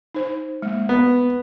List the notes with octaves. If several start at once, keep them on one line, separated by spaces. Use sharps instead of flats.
D#4 C5
G#3 A#3
B3